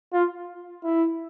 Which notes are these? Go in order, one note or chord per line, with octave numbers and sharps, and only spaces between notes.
F4
E4